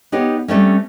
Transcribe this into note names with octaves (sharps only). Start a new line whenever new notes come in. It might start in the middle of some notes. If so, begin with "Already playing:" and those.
B3 D#4 G4 C#5
G3 A3 C4 C#4